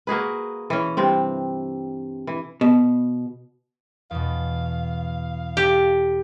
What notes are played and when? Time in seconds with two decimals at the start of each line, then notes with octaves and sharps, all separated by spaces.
0.07 A#3 F#4 G#4 B4
0.70 E3 C#4
0.97 G2 C3 C4
2.27 E3
2.61 B2
4.11 E2 B2 F5
5.57 G4 A4